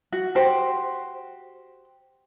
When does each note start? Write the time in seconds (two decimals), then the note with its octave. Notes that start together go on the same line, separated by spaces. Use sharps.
0.12 F#4
0.35 F#4 G4 C5